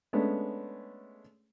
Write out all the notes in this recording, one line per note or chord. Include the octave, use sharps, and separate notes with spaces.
G#3 A3 B3 C#4 D4